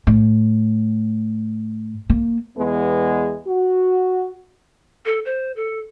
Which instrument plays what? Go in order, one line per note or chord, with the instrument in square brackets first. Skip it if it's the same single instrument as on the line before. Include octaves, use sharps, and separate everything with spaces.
[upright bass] A2
A#3
[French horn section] E2 G#3 B3
F#4
[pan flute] A4
C5
A4